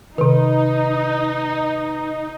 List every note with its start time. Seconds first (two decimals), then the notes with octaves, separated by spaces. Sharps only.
0.18 C3 D#3 D#4 B4